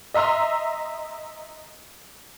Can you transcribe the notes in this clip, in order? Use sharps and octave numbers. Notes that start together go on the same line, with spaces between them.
D#5 E5 A#5 C6 E6